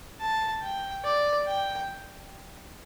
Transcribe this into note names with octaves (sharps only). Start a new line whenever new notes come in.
A5
G5
D5
G5